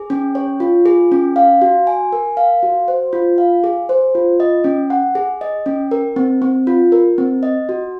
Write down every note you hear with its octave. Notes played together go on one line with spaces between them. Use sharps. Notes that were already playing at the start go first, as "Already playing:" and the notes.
Already playing: G#4
C#4
C#5
F4
G#4
C#4
F5
F#4
G#5
A#4
F5
F#4
C5
F4
F5
G#4
C5
F4
D#5
C#4
F#5
G#4
D#5
C#4
A#4
C4
C4
F4
A#4
C4
D#5
F#4